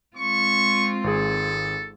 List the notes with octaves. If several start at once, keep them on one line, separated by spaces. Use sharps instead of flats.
G#3 C4 F4 C#6
G#1 G#4 A4